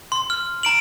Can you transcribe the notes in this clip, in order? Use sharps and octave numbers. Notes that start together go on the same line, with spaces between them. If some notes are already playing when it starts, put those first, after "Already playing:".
C6
F6
A#5 D7 F#7